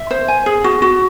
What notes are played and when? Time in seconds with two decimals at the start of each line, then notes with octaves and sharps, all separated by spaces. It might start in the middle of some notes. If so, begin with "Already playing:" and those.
Already playing: E5
0.11 C5
0.28 G#5
0.46 G#4
0.64 F#4
0.82 F#4